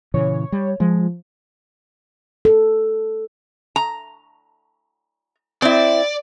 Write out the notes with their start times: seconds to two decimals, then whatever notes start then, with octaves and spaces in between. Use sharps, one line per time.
0.14 A#2 C#3 E3 C#5
0.52 G3
0.80 F3 G#3
2.45 A4
3.76 A#5
5.62 C4 E4 D5